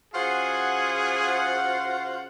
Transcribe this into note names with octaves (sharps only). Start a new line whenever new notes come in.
C#3 F4 F#4 G#4 C5 F#5